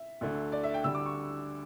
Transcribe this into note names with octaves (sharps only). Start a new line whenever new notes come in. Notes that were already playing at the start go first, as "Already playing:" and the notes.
Already playing: E5
D2 D3 A3
D5
E5
G5
D2 D3 G3 E6
D6
C#6